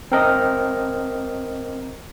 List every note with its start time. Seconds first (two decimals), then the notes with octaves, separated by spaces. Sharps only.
0.12 C4 A#4 D#5